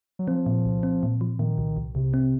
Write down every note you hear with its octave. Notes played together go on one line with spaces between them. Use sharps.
F#3
F3 C4
A#2
C2
C4
A#2
F3
A#2 D#3
C2
C2
C2 C3
C4